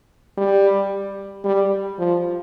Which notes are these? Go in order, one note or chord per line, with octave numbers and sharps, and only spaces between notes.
G3
G3
F3